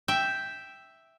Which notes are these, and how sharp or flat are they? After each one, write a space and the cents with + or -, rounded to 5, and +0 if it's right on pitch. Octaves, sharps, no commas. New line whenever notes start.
E5 +0 G5 +0